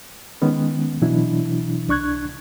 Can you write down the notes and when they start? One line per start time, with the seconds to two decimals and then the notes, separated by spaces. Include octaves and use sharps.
0.42 D#3 G#3 B3 C#4
1.02 B2 E3 F#3 D4 E4
1.88 C2 D4 C#6 F#6 G#6